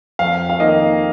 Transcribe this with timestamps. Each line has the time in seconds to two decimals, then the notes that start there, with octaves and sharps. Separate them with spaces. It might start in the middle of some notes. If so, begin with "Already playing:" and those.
0.19 F2 F5
0.50 F5
0.60 D#3 A#3 D#5